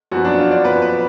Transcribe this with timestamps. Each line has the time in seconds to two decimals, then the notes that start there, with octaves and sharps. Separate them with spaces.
0.11 F#2 F3 B3 F#4
0.25 D4
0.38 F4
0.51 D5
0.64 F#2 F3 B3 B4
0.82 B4